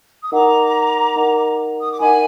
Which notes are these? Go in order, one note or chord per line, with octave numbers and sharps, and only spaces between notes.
D#6
D#4 A#4 D#5 F#5 A#5 D6
D#4 A#4 D#5 F#5
D#6
D6
D#4 A#4 D#5 F#5 G#5 B5